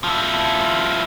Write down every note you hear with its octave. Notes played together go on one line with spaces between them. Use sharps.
F3 E4